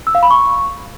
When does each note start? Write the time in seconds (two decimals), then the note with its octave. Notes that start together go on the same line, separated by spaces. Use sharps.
0.07 E6
0.15 F5
0.23 B5
0.31 C#6